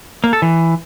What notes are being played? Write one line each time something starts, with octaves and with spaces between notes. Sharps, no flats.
A#3
A4
E3